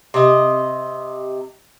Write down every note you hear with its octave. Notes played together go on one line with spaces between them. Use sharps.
C3 D#5